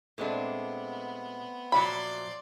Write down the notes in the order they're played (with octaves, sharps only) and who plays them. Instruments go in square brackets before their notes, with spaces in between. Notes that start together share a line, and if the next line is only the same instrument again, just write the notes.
[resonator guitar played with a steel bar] A#2 G#3 D4 [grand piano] A3 C4 [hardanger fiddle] B3
[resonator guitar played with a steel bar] A#2 F3 F#3 [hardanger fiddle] D5 C6 [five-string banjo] B5